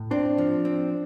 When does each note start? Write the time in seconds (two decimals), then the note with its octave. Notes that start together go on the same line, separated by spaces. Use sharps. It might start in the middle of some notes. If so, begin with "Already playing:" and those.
Already playing: A2
0.11 C4 D4
0.38 F3
0.65 C4